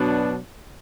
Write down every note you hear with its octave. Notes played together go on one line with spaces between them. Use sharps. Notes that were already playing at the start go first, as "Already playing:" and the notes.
Already playing: B2 F#3 B3 D4